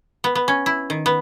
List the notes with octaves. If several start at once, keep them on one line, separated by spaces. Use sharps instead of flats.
B3
B3
C#4
E4
D#3
B3